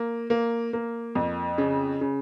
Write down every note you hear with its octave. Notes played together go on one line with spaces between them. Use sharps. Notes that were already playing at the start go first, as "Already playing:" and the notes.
Already playing: A#3
A#3
A#3
F2
C#3
C#3